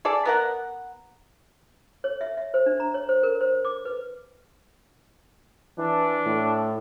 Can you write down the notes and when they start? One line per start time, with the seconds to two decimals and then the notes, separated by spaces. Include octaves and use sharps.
0.05 G#4 A4 D5
0.25 B3 A#4 F#5
2.04 C#5
2.21 E5
2.37 E5
2.54 C5
2.66 D4
2.80 A#5
2.94 C#5
3.09 C5
3.23 A#4
3.41 C5
3.65 D6
3.85 B4
5.78 E3 D4
6.26 A2